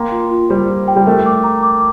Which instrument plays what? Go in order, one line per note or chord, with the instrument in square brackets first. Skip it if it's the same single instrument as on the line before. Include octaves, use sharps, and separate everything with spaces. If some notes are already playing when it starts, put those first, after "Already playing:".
Already playing: [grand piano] A#3 [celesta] G5 C6
[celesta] F4
F4
[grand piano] G3 [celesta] C5
[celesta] F4
G5
[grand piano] G3
[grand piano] A3 [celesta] A#4
[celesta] D6
A#5
D6